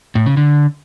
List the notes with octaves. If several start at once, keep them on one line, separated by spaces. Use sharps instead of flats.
A2
C#3
D3